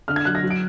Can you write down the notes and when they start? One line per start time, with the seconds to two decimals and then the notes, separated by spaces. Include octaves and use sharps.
0.08 D3 F6
0.16 G#6
0.25 F#3 F#6
0.35 A#6
0.43 F#3
0.51 D7